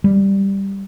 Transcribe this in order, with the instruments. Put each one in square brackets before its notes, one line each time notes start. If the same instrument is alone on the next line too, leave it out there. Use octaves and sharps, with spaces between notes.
[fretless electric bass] G3